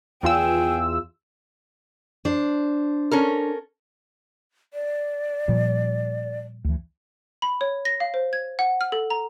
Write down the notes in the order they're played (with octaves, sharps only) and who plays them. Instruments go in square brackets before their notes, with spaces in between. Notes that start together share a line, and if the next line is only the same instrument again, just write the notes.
[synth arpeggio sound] E2 F4 E6 [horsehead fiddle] G#4 G5
[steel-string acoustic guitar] D4 C5
[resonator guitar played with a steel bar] C#4 A4 A#4
[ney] D5
[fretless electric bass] A#2 F3 G3
D2 E3
[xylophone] B5
C#5
A#6
F5
C5
G#6
F#5
F6
A4
A#5